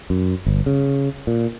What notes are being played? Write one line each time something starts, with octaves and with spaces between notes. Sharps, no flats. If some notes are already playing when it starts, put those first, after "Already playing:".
F#2
G1
C#3
A#2